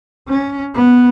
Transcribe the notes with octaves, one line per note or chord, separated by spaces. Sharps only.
C#4
B3